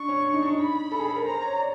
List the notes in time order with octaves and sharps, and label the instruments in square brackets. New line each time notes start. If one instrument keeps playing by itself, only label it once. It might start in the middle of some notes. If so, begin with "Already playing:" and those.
Already playing: [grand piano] D4 [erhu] C#6
[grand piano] C#4
D4
D#4
D4
D#4
[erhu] B5
[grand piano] A4
G#4
A4
A#4
[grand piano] C5 [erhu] A#5
[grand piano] C#5
D5